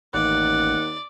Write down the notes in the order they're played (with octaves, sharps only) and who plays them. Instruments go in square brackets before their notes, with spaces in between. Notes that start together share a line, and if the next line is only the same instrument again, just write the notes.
[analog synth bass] A1 [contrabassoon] D#2 [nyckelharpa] D5 [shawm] F#5